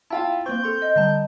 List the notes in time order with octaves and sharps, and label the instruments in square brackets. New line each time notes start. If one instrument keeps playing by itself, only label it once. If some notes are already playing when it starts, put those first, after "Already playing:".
[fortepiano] E4 F4 [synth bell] F5 G5 A5
[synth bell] A#3 C#6 [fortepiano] C4 [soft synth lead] G6
[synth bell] A4 C6
[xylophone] D#5
[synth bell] D3 G3 A5